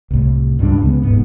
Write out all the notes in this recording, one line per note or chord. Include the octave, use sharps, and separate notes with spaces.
C2 A2
C#2 G2 F3 D4
C#2 C#3 B3
F1 G#2 B3